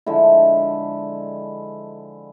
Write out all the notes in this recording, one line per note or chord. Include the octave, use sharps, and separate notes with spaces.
D3 F3 G#3 E4